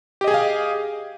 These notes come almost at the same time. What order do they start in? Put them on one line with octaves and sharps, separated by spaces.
G4 D#5 G#4 G#5 F5